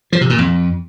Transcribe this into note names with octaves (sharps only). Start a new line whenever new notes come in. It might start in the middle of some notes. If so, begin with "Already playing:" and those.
F3
C3
A#2
F2